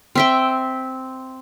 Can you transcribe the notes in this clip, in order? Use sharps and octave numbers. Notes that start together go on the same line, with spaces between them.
C4 E5 G5